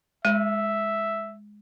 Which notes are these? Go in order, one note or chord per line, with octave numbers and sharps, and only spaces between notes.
G#3 E5